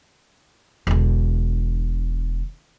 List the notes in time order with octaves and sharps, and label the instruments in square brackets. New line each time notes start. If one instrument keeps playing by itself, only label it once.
[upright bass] E1 D3